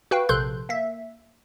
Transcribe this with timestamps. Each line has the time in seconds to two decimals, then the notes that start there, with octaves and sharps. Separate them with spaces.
0.11 F#4 B4 F5 G5
0.29 A#1 C3 A4 C6 F#6 G6
0.69 A#3 E5